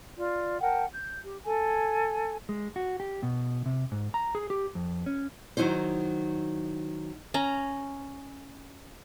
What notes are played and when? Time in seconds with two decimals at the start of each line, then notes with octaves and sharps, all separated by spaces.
0.17 F4 D5
0.61 A#4 F#5 G5 A5
0.91 G6
1.24 G4
1.45 A4 G#5
2.49 G#3
2.76 F#4
3.00 G4
3.23 B2
3.66 C3
3.92 G#2
4.14 A#5
4.35 G#4
4.50 G4
4.75 F2
5.06 C#4
5.57 D#3 F#3 D#4 E4 C5
7.34 C#4 A#5